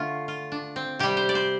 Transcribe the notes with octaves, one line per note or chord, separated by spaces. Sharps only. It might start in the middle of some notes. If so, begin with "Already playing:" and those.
Already playing: D3 A3 F4
F4
D4
C4
C3 G3 G4
C5
D5
C5